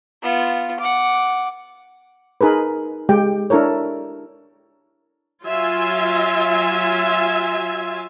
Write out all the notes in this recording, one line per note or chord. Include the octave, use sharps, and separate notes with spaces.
B3 F4
F#5 D6
D#4 G#4 A#4 B4
G#3 G4 G5
D4 E4 A4 A#4 C#5
F#3 F4 E5 G#5